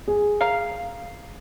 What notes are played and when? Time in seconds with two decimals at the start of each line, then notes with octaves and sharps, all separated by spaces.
0.08 G#4
0.41 A#4 F5